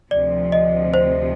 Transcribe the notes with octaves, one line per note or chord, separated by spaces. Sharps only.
D2 C3 F3 D5
D#5
C5